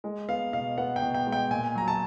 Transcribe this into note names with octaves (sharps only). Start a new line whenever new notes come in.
G#3
B3 F5
B2 F5
B3 F#5
G5
B2
G5
G#3
G5
A#2 G#5
F#3 A#5
A5